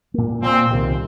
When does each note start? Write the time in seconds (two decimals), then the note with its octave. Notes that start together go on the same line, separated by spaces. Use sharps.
0.14 A#2 A#3
0.42 A#2 A#3 C4
0.71 C2 C3 D#3